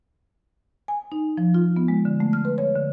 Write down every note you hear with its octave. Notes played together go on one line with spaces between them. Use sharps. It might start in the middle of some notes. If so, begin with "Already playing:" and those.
G#5
D#4
F3
F4
B3
G#3
D3
A3
F6
B4
C#5
D3